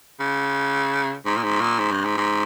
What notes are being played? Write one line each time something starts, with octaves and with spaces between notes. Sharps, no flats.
C#3
G#2
A#2
G#2
A#2
G#2
G2
G#2
G#2